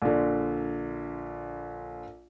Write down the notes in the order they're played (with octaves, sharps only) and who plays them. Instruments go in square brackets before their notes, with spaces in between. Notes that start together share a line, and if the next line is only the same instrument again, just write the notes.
[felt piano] A#1 D3